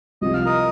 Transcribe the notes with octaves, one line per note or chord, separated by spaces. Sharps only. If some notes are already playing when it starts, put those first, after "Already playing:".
C2 C3 F3 C4 F4 D#5
F5
A#4 D#5